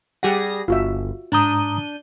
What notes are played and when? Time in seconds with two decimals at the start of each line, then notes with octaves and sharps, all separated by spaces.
0.23 G3 G4 G#4 F#5 A#6
0.68 G1 F4 F#4 E5
1.32 G#2 D4 A#5 D#6 G6 D#7